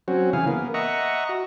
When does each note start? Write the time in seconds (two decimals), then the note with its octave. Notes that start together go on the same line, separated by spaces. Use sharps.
0.08 F#3 C4 C#4 F#4
0.33 C#3 E3 G#4 F5
0.47 A#3 B3
0.74 D#5 E5 F#5 A#5 C#6
1.29 F#4